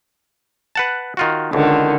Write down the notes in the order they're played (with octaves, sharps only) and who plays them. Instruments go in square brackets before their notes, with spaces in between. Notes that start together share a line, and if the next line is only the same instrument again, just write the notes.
[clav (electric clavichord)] B4 F#5 A5
D#3 F4 F#4
[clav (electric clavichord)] C#2 [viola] D3 D#3